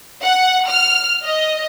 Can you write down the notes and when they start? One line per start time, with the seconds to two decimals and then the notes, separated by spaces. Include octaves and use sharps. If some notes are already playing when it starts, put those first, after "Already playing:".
0.23 F#5
0.69 F6
1.25 D#5